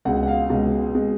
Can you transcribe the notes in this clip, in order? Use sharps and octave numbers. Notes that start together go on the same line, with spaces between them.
C#2 B2 G#3 F#5
F#5
F5
C#2 B2 G#3
B2 G#3